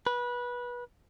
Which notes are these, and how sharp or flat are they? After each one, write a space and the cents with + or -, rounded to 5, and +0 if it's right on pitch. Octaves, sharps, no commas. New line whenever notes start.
B4 -20